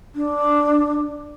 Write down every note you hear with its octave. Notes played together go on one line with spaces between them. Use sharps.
D4